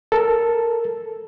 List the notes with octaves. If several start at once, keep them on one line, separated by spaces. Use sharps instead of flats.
A4 A#4